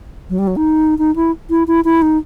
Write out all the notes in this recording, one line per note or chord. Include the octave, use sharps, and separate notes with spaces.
F#3
G3
F#3
D#4
D#4
E4
E4
E4
E4
D#4